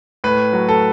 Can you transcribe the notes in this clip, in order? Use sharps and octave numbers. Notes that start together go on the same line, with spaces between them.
A2 B4
F#3
A4